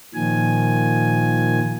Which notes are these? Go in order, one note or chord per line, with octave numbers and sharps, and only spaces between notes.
A#2 D#3 F3 G#5